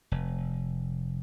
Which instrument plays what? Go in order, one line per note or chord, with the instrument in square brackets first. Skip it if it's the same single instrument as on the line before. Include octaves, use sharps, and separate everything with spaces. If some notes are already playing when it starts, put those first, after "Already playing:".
[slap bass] F1